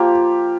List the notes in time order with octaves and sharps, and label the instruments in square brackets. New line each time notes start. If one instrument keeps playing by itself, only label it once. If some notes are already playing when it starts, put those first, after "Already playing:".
Already playing: [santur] F3 A#3 F4 [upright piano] G4